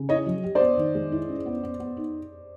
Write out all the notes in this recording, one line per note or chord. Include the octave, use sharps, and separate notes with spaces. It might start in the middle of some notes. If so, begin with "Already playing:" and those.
Already playing: C#3
E4 C#5 D#5
F#3
G4
C5 D5
B3
D#3
G#3
E4
C#4
B3
B3
B3
D#4